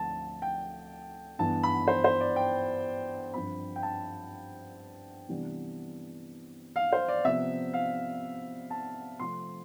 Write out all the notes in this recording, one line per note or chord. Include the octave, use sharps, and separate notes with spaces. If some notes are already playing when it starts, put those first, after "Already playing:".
Already playing: D2 D3 F3 C4 A5
G5
G2 E3 B3 A5
B5
C5
C5
D5
G5
G2 F3 C4 B5
G5
A5
C3 E3 G3 B3 D4
F5
C5
D5
C3 F3 B3 E5
F5
A5
C3 F3 A3 C4 C6